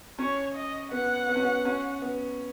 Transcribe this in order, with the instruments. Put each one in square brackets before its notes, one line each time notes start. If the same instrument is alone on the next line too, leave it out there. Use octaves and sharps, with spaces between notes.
[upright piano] C#4 [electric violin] C#5
[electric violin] D#5
[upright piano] B3 [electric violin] F#5
[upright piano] B3
C#4
B3
C#4
B3